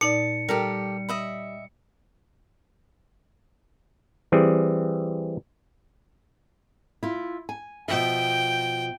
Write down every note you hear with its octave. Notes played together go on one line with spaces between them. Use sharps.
A#2 D#4 D5 A5 C#7
G3 G4 A4 A#4
D#5 E5 B5
E3 G3 C4 G#4
E4 F4
G#5
B2 F3 E5 G5